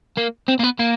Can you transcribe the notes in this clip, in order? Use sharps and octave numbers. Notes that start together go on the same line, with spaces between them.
A#3
C4
A#3
B3
A#3